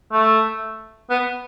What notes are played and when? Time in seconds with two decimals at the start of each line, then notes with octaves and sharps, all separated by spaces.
0.12 A3
1.10 B3